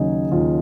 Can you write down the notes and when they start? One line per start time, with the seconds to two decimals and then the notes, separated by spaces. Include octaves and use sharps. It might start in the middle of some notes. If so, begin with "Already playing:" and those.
Already playing: D#2 C#3 F#3 D#4 G#4
0.32 D#2 F4